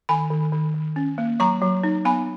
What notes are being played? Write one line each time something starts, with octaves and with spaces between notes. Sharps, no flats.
D#3 G#5 B5
D#3
D#3
D#3
C#4
A#3
F#3 A#5 C#6
F#3
D#4
B3 G#5 B5